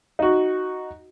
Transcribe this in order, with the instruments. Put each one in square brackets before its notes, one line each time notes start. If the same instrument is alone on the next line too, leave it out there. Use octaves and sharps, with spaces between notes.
[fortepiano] D#4 F#4